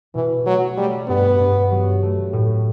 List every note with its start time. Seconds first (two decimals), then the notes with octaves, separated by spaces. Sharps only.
0.15 B2 E3
0.45 F#3 A3
0.77 G3 A3
1.08 G2 B3
1.40 G2
1.71 F#3
2.03 A3
2.33 A2